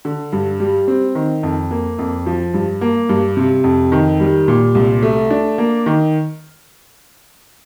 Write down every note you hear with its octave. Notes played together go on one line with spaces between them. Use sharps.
D3
G2
G3
C4
D#3
F2
A#3
F2
F3
G2
A#3
G2
C3
F2
D#3
G3
A#2
C2
A3
D4
A#3
D#3